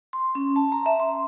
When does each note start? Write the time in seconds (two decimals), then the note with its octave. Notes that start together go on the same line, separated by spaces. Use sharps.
0.13 C6
0.35 C#4
0.56 A5
0.72 A#5
0.86 E5
1.00 C6